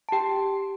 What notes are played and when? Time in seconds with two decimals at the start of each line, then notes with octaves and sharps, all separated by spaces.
0.09 A5
0.12 G4 G5